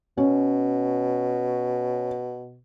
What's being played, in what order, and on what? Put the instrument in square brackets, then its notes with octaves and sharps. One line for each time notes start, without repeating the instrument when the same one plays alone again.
[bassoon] B2 [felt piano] C#4